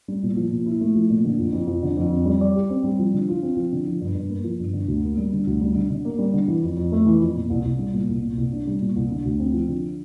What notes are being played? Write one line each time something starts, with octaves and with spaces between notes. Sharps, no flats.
G3
A#2
F3
A#2
E4
A3
F3
A#2
D3
F2
F2
F3
D3
F2
C4
G3
D5
G4
C4
G3
F3
D3
F4
C4
F3
D3
F3
G2
G2
A#3
F3
G2
D3
D2
A#3
G3
D3
D2
G3
D3
D3
A#3
G3
D3
E3
F2
F2
A3
E3
F2
A#2
C2
C2
G3
A#2
C2
A#2
C2
D4
G3
A#2
C2
D3
D2
C4
F3
D3